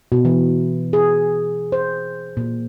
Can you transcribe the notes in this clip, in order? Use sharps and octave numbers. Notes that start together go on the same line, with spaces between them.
B2
E3
G#4
C5
A#2